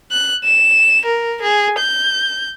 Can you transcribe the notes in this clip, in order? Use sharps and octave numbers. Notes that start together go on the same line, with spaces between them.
F#6
E7
A#4
G#4
G6